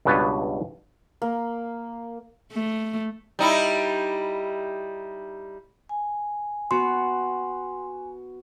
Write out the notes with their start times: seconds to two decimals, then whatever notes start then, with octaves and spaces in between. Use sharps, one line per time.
0.05 C#2 G2 B2 B4 C#5 A5
1.22 A#3
2.52 A3
3.39 G3 D#4 E4
5.89 G#5
6.71 B3 F#4 C6